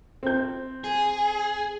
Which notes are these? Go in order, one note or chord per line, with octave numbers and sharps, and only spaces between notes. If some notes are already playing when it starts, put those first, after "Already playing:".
C4 G6
G#4